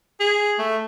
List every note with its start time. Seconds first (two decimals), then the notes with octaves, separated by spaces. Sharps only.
0.20 G#4
0.59 A3